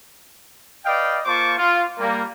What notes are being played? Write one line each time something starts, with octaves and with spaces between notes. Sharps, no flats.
B4 D5 D#5 F5 G5
A#3 F4 C5 A5 C#6 D6
F4
G3 A#3